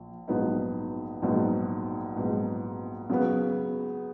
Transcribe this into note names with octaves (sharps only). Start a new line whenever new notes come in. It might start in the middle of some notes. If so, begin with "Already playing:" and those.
Already playing: A#1
A#1 G#2 F#3 B3 D#4
A#1 G#2 F#3 B3 D#4
A#1 G#2 F#3 B3 D#4
C#3 F#3 B3